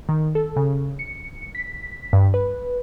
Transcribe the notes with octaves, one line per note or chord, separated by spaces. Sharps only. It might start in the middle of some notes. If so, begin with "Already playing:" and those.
D#3
A4
C#3
C#7
B6
G2
B4